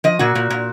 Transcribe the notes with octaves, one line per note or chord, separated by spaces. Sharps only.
F3 D#5
A#2 F#4
A#2
A#2